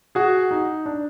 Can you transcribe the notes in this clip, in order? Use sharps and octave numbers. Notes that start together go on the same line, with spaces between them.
F#4 G#4
D#4
D4